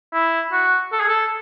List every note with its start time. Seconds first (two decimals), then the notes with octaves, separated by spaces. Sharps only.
0.13 E4
0.52 F#4
0.92 A4
1.00 G#4
1.09 A4